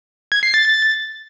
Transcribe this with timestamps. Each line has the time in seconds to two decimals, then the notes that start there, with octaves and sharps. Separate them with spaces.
0.32 G#6
0.43 C7
0.54 A6
0.65 A6